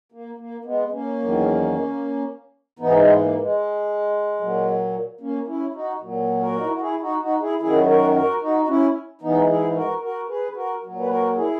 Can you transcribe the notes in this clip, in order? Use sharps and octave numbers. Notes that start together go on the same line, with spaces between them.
A#3
A#3
G#3 B3
A#3 C#4
E2 D#3 F#3
G#2 E3 B3 D#4
G#3 B3
A#3
G#3
A#2 F#3
A#3 C#4
C#4 E4
D#4 F#4
A#2 F#3
F#4 A#4
D#4
E4
F#4
E4 G#4
D#4 F#4
D#4 F#4
E4 G#4
F#2 D#3 F#3 E4 G#4
F#4 A#4
F#4 A#4
D#4 F#4
F#4
C#4 E4
G#2 E3 B3 D#4
E4 G#4
F#4 A#4
F#4 A#4
G#4 B4
F#4 A#4
A#2 F#3
B4
F#4 A#4
E4 G#4